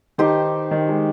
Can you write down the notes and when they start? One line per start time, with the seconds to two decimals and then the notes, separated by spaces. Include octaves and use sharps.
0.18 D#3 D#4 G4 C5
0.71 D#3
0.89 G#3